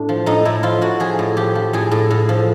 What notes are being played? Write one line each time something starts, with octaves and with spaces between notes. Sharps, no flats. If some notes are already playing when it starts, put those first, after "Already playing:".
Already playing: A2 D4
F3
A2 D#4
A2 E4
F3 F4
A2 F#4
F3 G#4
A2
F3 G4
F3
A2 G#4
A2
A2
F3